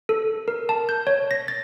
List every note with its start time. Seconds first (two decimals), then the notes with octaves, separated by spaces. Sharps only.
0.09 A4
0.48 A#4
0.69 A5
0.89 G6
1.07 C#5
1.31 A#6
1.48 A6